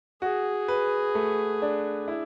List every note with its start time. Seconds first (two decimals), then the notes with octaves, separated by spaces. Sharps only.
0.22 F#4 G#4
0.68 B4
1.15 A3
1.62 D4
2.08 E4